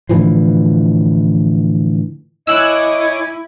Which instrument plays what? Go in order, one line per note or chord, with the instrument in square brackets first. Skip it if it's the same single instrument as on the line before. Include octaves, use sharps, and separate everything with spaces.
[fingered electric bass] A2 D3 E3 F3
[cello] E4 [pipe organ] C#5 G#5 D6 [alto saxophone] D#5 [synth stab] E6 F#6 E7